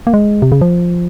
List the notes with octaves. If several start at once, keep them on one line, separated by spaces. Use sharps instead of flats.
A#3
G#3
C3
C#3
F3